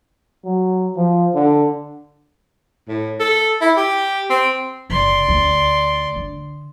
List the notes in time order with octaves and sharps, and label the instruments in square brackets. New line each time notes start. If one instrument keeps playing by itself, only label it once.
[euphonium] F#3
F3
D3
[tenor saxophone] A2
A4
E4
G4
C4
[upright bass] F#1 C3 [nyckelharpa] D5 C6
[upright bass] D2
D3